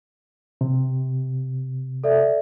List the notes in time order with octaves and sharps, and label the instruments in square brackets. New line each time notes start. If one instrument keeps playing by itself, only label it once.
[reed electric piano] C3
[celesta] A4 D5 E5